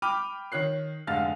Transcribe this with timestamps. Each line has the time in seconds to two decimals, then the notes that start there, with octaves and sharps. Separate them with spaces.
0.02 G5 B5 D6 F6 D#7
0.52 D#3 C#5 F#6 C7
1.07 F1 G#2 D3 F5 F6 A6